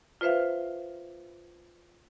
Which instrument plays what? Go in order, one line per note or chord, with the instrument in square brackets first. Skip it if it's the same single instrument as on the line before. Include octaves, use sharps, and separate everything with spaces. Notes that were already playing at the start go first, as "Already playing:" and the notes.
[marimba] F4 B4 C5 E5 F5